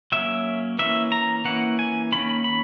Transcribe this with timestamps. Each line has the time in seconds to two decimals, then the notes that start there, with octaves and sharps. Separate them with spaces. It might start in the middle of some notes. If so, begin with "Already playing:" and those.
0.12 F#3 A#3 C#4 E5
0.79 E3 A#3 C#4 E5
1.12 A#5
1.45 E3 A#3 C#4 F#5
1.79 G#5
2.12 D#3 A#3 C#4 B5
2.44 B5